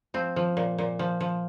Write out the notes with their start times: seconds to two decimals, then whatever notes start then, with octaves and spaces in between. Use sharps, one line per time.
0.14 F3 C4
0.36 F3
0.57 A#2
0.78 A#2
0.99 F3
1.21 F3